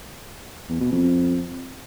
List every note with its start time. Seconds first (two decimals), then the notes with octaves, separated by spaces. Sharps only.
0.69 E2
0.81 B2
0.92 F2